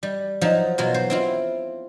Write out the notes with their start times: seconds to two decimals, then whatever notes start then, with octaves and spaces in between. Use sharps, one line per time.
0.03 G3
0.41 F3 F#3 D#4
0.78 B2 F#3 F4
0.94 C5
1.10 C4 E4 F4